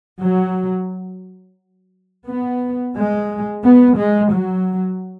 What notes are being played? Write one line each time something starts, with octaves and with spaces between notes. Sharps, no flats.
F#3
B3
G#3
B3
G#3
F#3